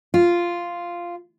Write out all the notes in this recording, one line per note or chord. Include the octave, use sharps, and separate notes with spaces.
F4